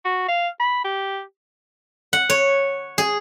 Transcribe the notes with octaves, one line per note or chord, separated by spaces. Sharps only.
F#4
F5
B5
G4
F#5
C#5
G#4